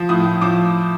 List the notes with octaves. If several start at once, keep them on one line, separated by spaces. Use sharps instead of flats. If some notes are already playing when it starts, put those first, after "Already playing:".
Already playing: F3
A2 D#6
A2
F3 D6